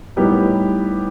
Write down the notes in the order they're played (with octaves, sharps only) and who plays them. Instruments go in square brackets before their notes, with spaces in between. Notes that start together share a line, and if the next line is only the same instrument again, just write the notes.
[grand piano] A2 G3 B3 D#4 G4